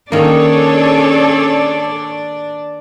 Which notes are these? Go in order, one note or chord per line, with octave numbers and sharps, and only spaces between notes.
D#3 A#3 C#4 D4 G#4 A4 C#5 D5